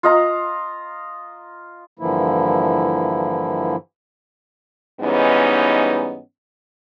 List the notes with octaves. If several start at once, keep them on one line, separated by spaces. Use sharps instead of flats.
F4 D#5 A#5
G2 D3 E3 F3 A#3 E4
G#2 E3 G3 B3 C#4 D#4